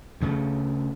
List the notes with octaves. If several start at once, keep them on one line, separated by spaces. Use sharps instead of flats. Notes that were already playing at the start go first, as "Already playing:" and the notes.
D2 C#3 A3